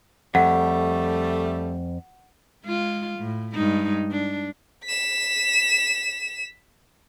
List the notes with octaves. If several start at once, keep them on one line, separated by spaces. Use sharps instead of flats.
F2 G3 A3 F#5
G#3 F4
A2
G2 G#3 D#4
D4
B6 E7